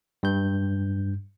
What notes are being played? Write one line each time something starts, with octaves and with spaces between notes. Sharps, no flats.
G2 G6